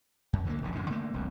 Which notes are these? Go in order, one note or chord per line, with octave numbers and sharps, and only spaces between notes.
F#2
D2 D3 G3 A#3
F1 A#1 C#3
F#2 A2 D3
D3 A3 A#3
E1 C2 F2